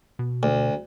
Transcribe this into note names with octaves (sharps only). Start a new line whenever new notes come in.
B2
D2